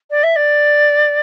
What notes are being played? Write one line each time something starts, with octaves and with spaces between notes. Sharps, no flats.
D5
E5
D5